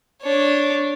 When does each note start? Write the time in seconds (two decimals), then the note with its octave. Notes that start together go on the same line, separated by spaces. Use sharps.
0.22 D4 C#5